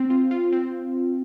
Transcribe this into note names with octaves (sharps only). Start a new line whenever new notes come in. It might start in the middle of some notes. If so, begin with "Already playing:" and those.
Already playing: C4
F4
F4
C4